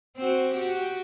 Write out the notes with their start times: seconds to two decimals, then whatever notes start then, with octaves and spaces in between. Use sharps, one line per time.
0.17 C4 F#4
0.53 F#4 G4